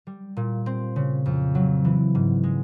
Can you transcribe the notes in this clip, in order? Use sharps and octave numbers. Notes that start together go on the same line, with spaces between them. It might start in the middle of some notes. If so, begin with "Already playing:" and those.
G3
A#2
C4
C#3
F2
F#3
E3
G#2
G#3